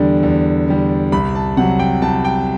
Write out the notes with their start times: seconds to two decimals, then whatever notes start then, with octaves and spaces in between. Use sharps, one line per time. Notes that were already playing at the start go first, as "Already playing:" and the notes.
Already playing: E2 D3 G3
0.23 E2
0.68 D3 G3
1.12 C2 B5
1.35 A5
1.57 C3 F#3 F#5
1.79 G5
2.02 C2 A5
2.25 G5